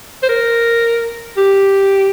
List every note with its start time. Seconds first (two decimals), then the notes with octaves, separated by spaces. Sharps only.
0.23 C5
0.29 A#4
1.37 G4